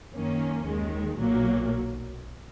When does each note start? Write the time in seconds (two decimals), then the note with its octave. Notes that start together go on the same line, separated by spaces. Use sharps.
0.13 F#2 D#3 A#3 C#4
0.66 D#2 D#3 G#3
1.19 B1 A#2 F#3 A#3